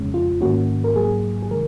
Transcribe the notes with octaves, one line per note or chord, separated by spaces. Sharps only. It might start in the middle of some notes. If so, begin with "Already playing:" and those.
Already playing: F2 C#3 G#3 C#4
F4
G#2 D#3 A#3 C#4 F#4
A#4
G#2 F#3 A#3 G#4
G#4
C3 D#3 G#3 A#4